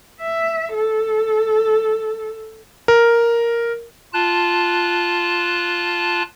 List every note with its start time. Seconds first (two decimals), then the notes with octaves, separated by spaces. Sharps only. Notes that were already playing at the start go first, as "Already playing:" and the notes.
0.22 E5
0.73 A4
2.88 A#4
4.13 F4 A5 F#6